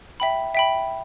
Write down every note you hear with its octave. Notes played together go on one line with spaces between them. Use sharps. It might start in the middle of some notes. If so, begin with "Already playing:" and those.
E5 G5 B5
E5 G5 B5